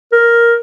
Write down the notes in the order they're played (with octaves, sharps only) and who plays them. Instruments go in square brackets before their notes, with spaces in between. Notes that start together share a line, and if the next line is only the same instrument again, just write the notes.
[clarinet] A#4